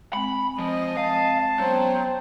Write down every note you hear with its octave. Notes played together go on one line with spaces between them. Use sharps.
G#3 C4 B5
F3 D#5
F5 A5
F#3 B3 C#4 C5 G5